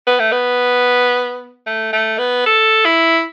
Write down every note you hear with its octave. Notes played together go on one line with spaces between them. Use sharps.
B3
A3
B3
A3
A3
B3
A4
E4